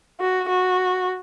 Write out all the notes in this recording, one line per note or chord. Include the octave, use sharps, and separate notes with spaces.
F#4
F#4